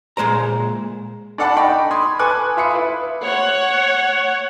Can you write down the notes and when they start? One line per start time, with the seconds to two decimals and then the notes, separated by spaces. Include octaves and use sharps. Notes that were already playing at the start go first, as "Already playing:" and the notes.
0.17 A#2 G#3 C5 A#5
1.38 D4 A4 D5 F#5 A5 B5
1.57 D#4 G5 B5 C#6
1.91 B5 C6 D#6 G#6
2.19 A4 B4 G#5 C#6 D6 F#6
2.57 F4 E5 B5 D#6 C#7
2.73 E4 B4
3.23 C#5 F#5